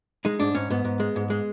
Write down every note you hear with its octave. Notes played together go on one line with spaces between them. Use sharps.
G#3 D#4
G#2 D4
G#2 C#4
G#2 B3
G#2
G#3
G#2
G#3